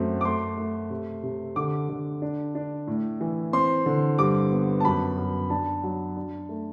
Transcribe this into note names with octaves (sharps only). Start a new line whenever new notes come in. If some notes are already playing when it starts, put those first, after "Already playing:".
Already playing: F#2 A3 C4
D6
A3 C6
A3
C3
C3
D3 D6
D3
D4
D4
A2
E3
C4 C6
D3
G2 D6
B3
A5
F#2 B5
F#2
D4 A5
F#3
D4
A3